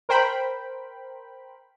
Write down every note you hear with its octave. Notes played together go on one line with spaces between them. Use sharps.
A#4 C5 G5 B5